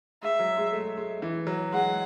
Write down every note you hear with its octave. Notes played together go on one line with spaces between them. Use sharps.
G#3 E5
F#3
G#3
A3
G#3
E3
F#3
G#3 F#5